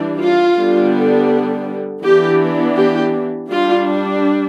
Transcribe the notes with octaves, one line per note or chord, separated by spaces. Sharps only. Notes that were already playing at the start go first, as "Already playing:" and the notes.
Already playing: E3 G3 D4
F4
D3 G3 B3 D4
E3 B3 D4 G4
G4
G3 D4 F4